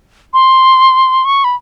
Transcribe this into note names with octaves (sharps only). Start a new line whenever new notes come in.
C6
C#6
B5